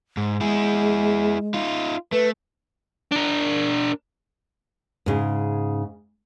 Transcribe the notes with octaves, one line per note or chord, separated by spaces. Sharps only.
G#2
G#3 E4 G#4
D#4 F4
A3 B4
D4 A#4
G#2 C#3